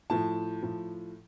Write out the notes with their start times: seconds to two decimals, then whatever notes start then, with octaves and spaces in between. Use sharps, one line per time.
0.10 A2 F3 A5
0.62 A2 F3